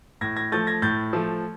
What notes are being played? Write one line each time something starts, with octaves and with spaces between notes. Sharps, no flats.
A2 G#6 A#6
G#6 A#6
F3 A3 G6 A6
G#6 A#6
A2 G6 A6
F3 A3